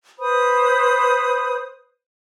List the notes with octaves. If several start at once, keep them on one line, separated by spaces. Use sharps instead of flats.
B4 C5 B5 D#6